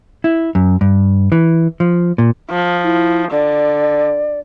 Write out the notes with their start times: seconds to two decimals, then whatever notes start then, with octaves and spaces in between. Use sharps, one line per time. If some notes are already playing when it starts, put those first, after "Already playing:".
0.24 E4
0.55 F#2
0.81 G2
1.32 E3
1.80 F3
2.18 A#2
2.50 F3
2.84 E4
3.31 D3 D5